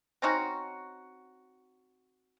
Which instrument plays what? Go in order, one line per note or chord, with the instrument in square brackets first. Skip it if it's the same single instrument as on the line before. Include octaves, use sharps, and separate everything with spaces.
[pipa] C4 C#4 D#4 F#4